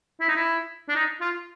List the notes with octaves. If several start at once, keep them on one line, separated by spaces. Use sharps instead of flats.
E4
D#4
E4
D4
D#4
F4